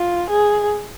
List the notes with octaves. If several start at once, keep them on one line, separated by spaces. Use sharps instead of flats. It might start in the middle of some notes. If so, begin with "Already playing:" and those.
Already playing: F4
G#4